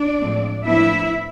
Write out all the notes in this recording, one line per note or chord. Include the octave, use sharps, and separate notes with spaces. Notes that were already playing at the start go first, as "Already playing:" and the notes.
Already playing: D4 D5
A2 F3 G#3 C4
A2 F3 B3 D4 E4 E5